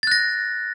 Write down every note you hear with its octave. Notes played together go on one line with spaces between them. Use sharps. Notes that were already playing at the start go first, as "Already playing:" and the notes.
F#6 A6 A#6